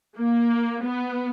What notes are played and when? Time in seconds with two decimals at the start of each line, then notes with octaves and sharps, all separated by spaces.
0.17 A#3
0.83 B3